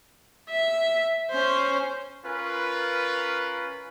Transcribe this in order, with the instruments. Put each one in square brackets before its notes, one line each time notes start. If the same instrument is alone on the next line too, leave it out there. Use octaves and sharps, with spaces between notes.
[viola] E5
C#4 C5
[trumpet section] C#4 F4 A#4 B4